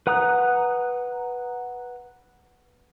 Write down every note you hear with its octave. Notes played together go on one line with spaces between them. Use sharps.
B4 F#5 A#5 D#6 F#6